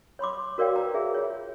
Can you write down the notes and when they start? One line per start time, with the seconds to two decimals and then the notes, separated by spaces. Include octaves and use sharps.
0.19 C#5 B5 C6 D6
0.58 F#4 A#4 C#5 D5 F5 G5
0.76 B4 A#5
0.94 G#4 E5
1.14 F4 C#5